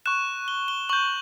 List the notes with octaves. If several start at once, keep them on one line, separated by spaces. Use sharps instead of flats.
C#6 F#6 E7
G7
G7
C#6 G6 F#7